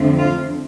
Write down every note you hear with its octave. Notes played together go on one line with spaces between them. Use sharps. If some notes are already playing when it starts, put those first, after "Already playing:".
Already playing: F2 D3 F3 A3 C4
F4